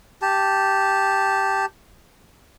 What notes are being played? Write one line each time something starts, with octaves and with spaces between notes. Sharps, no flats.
G4 A5